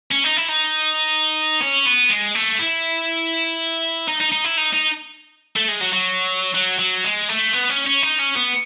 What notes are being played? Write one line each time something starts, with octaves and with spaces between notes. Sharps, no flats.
C#4
D#4
E4
D#4
C#4
B3
G#3
A3
E4
D#4
D#4
D#4
E4
D#4
D#4
A3
G#3
F#3
F#3
F#3
F#3
G#3
A3
B3
C#4
C#4
D#4
C#4
B3